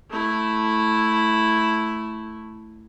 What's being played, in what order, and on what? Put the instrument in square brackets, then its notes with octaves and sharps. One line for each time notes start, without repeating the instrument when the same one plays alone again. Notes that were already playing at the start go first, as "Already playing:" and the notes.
[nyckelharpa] A3 E4